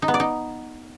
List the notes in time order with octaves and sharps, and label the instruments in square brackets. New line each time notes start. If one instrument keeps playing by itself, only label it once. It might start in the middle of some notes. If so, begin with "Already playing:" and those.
[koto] D#4
B3
D5
D#4